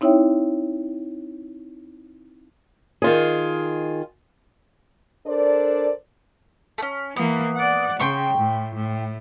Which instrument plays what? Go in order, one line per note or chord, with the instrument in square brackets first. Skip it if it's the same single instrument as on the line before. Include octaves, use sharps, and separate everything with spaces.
[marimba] C4 D#4 E4 C#5 E5 G5
[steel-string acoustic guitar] D#3 F4 G#4
[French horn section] D4 A4 A#4 C5 D5
[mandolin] A3 C#4
[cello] E3 A#3 [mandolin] B3
[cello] D5 F#5
[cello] C#3 [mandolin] G5 C6 C#6
[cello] A2
A2